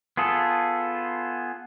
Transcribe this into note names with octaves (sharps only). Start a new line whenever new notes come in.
B3 F4 G#4 A4